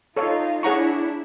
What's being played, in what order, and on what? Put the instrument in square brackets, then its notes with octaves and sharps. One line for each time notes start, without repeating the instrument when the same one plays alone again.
[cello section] D#4 F4 [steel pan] A4 C#5 F5
[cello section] D4 E4 [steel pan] G#4 C#5 F#5 A#5 C#6